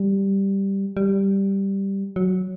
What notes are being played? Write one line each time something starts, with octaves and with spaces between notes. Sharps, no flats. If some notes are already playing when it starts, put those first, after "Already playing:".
Already playing: G3
G3
F#3